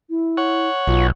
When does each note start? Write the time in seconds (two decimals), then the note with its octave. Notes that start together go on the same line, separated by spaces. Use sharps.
0.10 E4
0.37 C#5 F#5
0.87 B1 F4